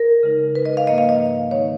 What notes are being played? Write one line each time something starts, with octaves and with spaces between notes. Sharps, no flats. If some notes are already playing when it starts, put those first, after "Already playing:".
Already playing: A#4
C#3 G#3 D#4
B4
D#5
F5
G#2 F3 A#3 D#5
F5
D#5
D#3 G#3 D#4 C#5